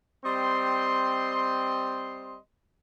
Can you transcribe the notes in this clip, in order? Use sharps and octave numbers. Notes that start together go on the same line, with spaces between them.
G3 C4 D#5 C6